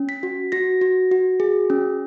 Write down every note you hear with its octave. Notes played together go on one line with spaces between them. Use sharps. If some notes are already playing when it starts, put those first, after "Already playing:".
Already playing: C#4
B6
F#4
F#4 A#6
F#4
F#4
G#4
C#4